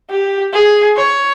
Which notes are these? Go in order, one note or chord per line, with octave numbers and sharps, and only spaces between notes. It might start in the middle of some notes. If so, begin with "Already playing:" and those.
G4
G#4
C#5